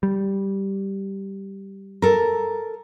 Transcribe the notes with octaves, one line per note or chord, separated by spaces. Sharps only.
G3
A4 A#4